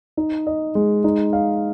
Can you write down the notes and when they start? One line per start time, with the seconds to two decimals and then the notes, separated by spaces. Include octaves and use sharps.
0.17 D#4
0.47 D#5
0.75 G#3
1.04 D#4
1.33 F5